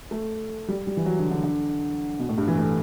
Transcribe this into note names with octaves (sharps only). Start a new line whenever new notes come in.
A3
G3
G3
E3
F#3
D3
D3
D3
B2
A2
G2
E3
A3